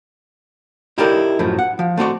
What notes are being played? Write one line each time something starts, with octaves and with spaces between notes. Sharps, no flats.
D#4 E4 G4 A4 A#4 D5
F#2 A2 F3
F#5
F3
A3 C4 F#4 D5